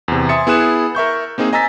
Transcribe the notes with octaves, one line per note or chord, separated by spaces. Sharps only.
E2 C3
E5 G#5 C6 D#6 A6 C#7
B3 E4 G#4 D#6 F#6 E7
A#4 E5 C#6 G6
A#3 C4 D#4 G#4
D#5 G#5 A#5 E6 A6 B6